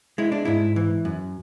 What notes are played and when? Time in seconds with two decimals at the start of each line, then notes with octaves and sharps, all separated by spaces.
0.18 G#3 E4
0.32 D4
0.45 G#2 E4
0.76 E3
1.05 F#2